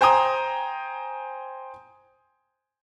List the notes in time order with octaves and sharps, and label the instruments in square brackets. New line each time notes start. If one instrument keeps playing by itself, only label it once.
[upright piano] C5 G5 G#5 A#5 D#6